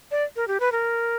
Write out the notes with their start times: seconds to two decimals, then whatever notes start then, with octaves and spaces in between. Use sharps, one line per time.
0.11 D5
0.36 A#4
0.47 G4
0.60 B4
0.72 A#4